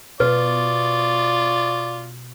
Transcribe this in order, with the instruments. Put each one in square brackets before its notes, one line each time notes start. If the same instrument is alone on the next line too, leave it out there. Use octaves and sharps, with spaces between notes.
[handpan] B2 [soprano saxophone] F4 [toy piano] B4 [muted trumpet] D5